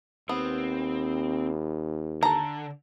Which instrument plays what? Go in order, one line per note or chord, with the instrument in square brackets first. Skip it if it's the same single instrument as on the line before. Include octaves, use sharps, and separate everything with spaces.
[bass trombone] D#2 [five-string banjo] B3 [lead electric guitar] C4
[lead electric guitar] D3 [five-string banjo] A4 A#5